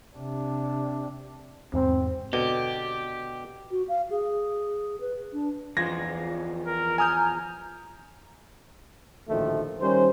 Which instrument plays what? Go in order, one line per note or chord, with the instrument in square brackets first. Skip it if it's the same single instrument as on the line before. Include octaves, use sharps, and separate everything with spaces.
[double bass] C3 D4
[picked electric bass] E2 G#2 C3 [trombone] C4
[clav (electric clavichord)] B2 D3 [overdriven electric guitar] G4
[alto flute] F#4
F5
G#4
B4
D4
[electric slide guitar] E2 F3 F4 [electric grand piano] G#6 A#6
[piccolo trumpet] A#4
[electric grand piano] G#5 D#6 G6 [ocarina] A#5 [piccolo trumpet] F6
[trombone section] A1 D2 A#2 D#3 F3 A3
D#3 G3 C#4 A#4 C5